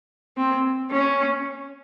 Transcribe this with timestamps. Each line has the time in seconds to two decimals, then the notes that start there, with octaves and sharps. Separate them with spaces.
0.37 C4
0.91 C#4